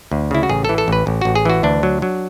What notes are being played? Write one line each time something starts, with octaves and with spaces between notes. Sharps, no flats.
D2
C#3 E4
F#4
A1 G#4
A4
E3
A4
A1 B4
A1
A1 F#4
G#4
E3 F#4
D2 D4
F#3
F#3